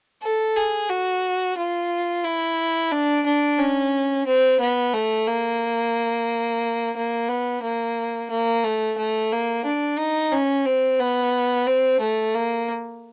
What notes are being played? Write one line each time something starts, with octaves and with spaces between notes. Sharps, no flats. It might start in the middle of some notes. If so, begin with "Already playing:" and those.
A4
G#4
F#4
F4
E4
D4
D4
C#4
C4
B3
A3
A#3
A#3
B3
A#3
A#3
A3
A3
A#3
D4
D#4
C#4
C4
B3
C4
A3
A#3